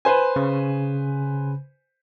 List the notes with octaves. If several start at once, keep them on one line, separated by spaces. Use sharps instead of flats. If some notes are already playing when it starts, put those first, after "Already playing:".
B4 C5 G#5
C#3